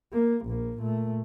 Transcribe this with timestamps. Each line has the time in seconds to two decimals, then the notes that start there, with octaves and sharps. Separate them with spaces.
0.13 A#3
0.46 A#1 A#3
0.78 A#2 A3